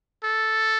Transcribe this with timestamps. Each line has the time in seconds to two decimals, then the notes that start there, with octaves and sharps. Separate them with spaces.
0.24 A4